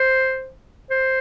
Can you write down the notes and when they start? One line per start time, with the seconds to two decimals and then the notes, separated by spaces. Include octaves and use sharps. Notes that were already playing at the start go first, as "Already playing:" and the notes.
Already playing: C5
0.90 C5